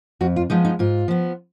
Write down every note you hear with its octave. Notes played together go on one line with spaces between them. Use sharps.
F2 F#4
F4
F3 G#3 B3 D#4
D#4
G#2 F4
F3 B3